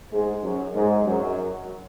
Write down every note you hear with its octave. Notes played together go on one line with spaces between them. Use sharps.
G#2 G#3
F#2 F#3
G#2 G#3
F#2 F#3